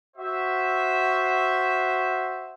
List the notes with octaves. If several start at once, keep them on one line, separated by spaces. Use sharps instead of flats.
F#4 C5 E5